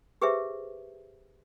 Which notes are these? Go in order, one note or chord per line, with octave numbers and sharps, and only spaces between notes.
G4 G#4 B4 C5 E5